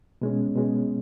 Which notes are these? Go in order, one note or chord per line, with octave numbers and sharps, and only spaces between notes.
B2 G#3 C#4
B2 G#3 C#4